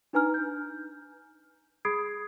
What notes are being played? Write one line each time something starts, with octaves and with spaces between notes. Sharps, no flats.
D4 D#4 B4 G#5 A#5 F6
G6
G#4 B5 D#6 G#6 C7 D7